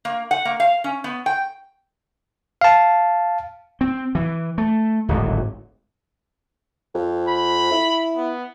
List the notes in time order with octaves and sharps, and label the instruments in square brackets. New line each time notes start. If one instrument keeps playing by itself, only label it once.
[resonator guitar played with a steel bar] A#3
F#5
A#3
F5
C#4
B3
G5
[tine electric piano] F5 A5
[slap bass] C4
E3
A3
D1 G#1 G#2
[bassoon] F2
[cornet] B5
[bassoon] E4
[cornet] B3